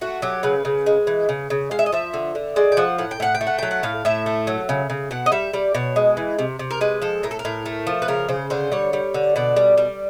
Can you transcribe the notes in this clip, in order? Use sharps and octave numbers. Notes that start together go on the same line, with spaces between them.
A3 F#4
F#3 G4
C#3 B4
C#3
G#3
E3
C#3
C#3
G#3 F5
E5
D#5
F3 E5
D3
D3
G#3 D5
G5
F3 F#5
A2 F#5
G5
A2 F#5
G5
A3
F#5
F#3 G5
F#5
A2 F5
A2 E5
A3
F#3
C#3
C#3
B2 F#5
D#5
G3 E5
G3 D5
B2 C#5
G#3
E3
C3
C3
A#4
G#3 B4
F3 A4
A2 A#4
A4
A#4
A2
A3
F3
B4
C#3 A#4
C#3 C5
D3 C5
G3 C#5
G3
D3
B2 D5
G3
G3